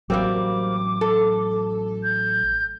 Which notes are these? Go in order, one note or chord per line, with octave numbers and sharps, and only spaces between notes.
A1 F#3 G3 A#3 C4 D6
A4
G6